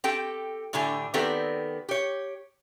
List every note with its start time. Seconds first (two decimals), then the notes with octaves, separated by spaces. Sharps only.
0.04 C4 G4 A4 G5
0.73 A2 D3 D4 E4 G4 G#5
1.14 D#3 B3 C4 G4 A4 D5
1.89 G4 C#5